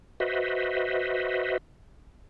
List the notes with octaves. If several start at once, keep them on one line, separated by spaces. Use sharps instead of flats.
F#4 B4 C5 D#5 E5